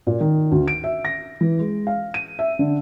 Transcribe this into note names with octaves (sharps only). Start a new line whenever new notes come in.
A#2
D#3
D2
D7
E5
A#6
E3
G#3
F5
D#7
E5
D3